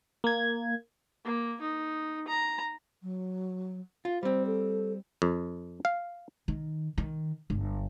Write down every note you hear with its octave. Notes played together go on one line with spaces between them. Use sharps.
A#3 G#6
A#3
D#4
A#5
F#3
F4
G3 C4 C5
A4
F2
F5
D#3
D#3
G1